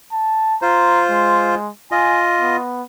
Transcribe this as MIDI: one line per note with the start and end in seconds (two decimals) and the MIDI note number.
0.13 0.56 81
0.62 1.55 65
0.62 1.55 72
0.62 1.01 82
1.09 1.70 56
1.92 2.57 65
1.92 2.57 75
1.92 2.22 80
2.40 2.82 59